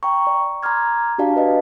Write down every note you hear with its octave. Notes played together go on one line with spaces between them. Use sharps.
G5 A#5 C#6
D5
A#5 C6 D6 F6 G#6
D4 F#4 G4 D5 F5 A5
B4 D#5